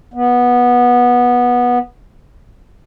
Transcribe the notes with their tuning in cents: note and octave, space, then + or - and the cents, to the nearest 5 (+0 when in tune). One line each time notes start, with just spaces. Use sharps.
B3 -15